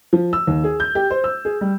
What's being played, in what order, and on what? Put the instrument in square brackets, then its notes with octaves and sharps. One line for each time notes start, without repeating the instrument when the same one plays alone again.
[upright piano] F3
E6
D#2
G#4
G6
G4
C5
E6
G#4
G3